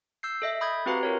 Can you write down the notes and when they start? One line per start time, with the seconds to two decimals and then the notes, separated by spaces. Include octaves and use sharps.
0.23 E6 G6 C7
0.42 A4 D#5 E5
0.61 B5 D#6 G6 G#6
0.86 C4 F#4 G4 B4 F5 A#5
1.03 F4 A#4 C#5